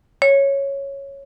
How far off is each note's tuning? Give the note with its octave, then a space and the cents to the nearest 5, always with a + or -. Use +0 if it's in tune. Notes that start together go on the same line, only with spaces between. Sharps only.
C#5 -5